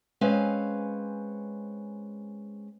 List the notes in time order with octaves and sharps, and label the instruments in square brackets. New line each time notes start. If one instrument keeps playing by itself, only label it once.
[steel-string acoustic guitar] G#3 C4 C#4 B4 F5